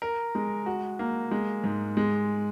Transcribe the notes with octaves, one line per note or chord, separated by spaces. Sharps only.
A#4
G#3
F#4
A#3
G#3
G#2
G#3